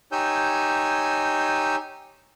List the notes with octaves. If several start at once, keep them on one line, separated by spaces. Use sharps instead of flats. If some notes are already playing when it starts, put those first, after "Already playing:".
D#4 G4 C#5 G#5 E6 G6